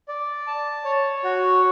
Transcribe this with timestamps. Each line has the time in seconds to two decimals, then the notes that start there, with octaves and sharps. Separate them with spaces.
0.08 D5
0.47 A5
0.85 C#5
1.24 F#4